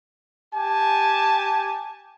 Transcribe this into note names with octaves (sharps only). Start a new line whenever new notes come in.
G4 G#5 A5